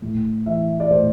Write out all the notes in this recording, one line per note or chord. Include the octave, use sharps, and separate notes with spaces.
A2
E3 E5
D5
A2 C5